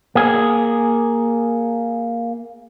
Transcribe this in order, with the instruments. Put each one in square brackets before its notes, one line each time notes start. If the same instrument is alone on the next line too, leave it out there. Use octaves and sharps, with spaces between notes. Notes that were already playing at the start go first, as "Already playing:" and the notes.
[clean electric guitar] A#3 G#4